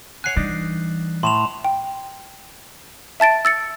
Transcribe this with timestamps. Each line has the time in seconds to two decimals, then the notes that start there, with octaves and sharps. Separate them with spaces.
0.24 C#5 F#5 G#5 F#6 C7
0.37 E3 G3 D4 D#4
1.23 A2 C6 E7 F7
1.64 G5
3.20 E5 A5 A6 D7
3.45 E6 A6 C#7